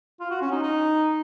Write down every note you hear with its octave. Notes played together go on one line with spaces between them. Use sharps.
F4
F#4
C#4
D#4
D#4